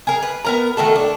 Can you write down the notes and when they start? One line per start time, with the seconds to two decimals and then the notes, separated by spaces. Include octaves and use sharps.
0.07 G#4 A#4
0.22 B4
0.45 B3 A#4 A#5
0.77 D#3 A3 F#4 A4
0.96 D4